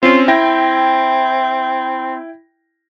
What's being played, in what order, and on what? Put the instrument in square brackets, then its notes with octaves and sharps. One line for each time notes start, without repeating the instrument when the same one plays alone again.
[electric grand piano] C4 C#4 [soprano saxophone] F4
[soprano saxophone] C4 [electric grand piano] E4 G5 A#6